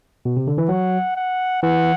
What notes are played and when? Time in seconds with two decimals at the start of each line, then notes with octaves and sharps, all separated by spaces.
0.25 B2
0.37 C3
0.47 D3
0.58 E3
0.69 F#3 F#5
1.16 F#5
1.63 E3 F#5